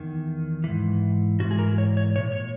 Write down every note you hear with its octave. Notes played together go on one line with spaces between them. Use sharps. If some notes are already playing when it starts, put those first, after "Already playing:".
Already playing: E2 D#3
G#2 E3
G#2 E3 F#4
G#4
A#4
C#5
C#5
A#2 C#5
C#5